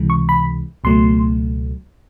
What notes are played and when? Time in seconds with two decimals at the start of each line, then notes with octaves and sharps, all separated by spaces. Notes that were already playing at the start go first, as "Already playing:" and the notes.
Already playing: C#2 C3 E3 G#3
0.10 C#6
0.29 B5
0.84 C#2 B2 F#3 A3 C6